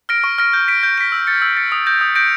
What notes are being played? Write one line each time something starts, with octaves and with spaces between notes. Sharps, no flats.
F6 A#6 D7
C#6
F6 A#6 D7
G6
B6 D7
G6
B6 D7
E6
A6 C#7
E6
A6 C#7
D#6
G6 A#6 D7
D#6
G6 A#6 D7